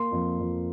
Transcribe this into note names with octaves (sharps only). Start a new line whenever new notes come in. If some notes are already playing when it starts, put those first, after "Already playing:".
Already playing: A#3 C6
F2
F2